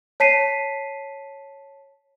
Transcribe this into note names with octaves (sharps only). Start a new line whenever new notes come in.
C#5 A5 B6 C7 D#7